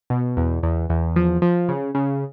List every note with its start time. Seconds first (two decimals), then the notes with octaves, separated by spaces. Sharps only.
0.10 B2
0.37 E2
0.63 E2
0.90 E2
1.16 F3
1.42 F3
1.69 C#3
1.95 C#3